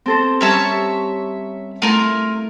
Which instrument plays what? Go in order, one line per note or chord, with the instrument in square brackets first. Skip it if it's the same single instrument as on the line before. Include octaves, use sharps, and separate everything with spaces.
[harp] C4 A4 C5
[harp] G3 C#4 A#4 [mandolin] C#5 E5 A5
[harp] A3 E4 [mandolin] F4 A#4 A#5